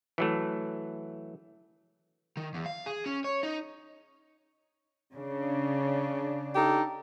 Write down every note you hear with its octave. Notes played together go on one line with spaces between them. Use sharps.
E3 F#3 A3
D#3
E2
F5
G#4
C#4
C#5
D#4
C#3 D4
D#4 G4 A4